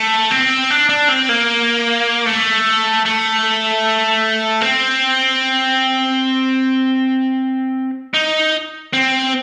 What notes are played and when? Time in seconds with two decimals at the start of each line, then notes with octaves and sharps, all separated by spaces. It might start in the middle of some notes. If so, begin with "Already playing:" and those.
Already playing: A3
0.31 C4
0.71 D4
0.89 D4
1.09 C4
1.29 A#3
2.26 A3
3.06 A3
4.61 C4
8.14 D#4
8.93 C4